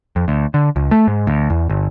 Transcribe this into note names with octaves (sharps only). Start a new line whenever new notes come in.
F2
D2
D3
C#2
A3
G#2
D2
E2
G1